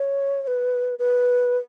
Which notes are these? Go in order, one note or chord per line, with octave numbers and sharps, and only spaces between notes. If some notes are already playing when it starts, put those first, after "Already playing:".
Already playing: C#5
C#5
B4
B4